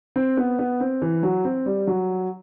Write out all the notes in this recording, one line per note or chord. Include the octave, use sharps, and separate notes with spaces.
C4
B3
B3
C4
E3
F#3
C4
G3
F#3